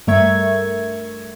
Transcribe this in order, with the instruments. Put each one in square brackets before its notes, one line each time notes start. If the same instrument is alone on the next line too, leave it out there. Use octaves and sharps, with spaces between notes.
[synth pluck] G2 A3 A#4 E5 C#6 G#6